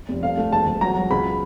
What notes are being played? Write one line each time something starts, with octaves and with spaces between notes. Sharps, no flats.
F1
A3 F5
A3
E1 A5
E1
F#3 A#5
F#3
C#2 B5